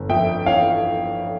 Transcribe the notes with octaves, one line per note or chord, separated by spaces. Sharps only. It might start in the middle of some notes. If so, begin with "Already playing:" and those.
Already playing: G1
F2 E5 G5
E3 C#5 F5